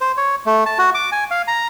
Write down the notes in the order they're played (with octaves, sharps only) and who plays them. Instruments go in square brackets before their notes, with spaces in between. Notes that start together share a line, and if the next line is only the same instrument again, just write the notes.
[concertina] C5
C#5
A3
A5
F#4
D6
G#5
F5
A#5